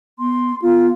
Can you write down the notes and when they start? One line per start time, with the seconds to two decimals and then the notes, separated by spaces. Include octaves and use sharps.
0.19 B3 C6
0.62 B3 F4